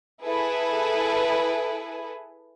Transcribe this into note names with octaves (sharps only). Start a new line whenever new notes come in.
E4 G#4 A4 B4